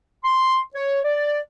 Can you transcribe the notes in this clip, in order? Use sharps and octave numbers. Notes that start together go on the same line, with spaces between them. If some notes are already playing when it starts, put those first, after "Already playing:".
C6
C#5
D5